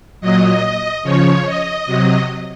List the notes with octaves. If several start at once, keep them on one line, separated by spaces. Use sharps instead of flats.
A#2 F#3 D#5
C#3 F3 C#5
D#5
C3 F#3